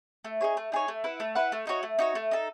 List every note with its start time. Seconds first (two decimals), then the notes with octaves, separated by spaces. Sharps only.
0.24 A3
0.41 D#4 G#4 C#5
0.57 A3
0.72 D#4 G#4 C#5
0.88 A3
1.04 E4 B4 F#5
1.20 A3
1.35 E4 B4 F#5
1.52 A3
1.67 D#4 F#4 C#5
1.83 A3
1.99 D#4 F#4 C#5
2.15 A3
2.31 D#4 A4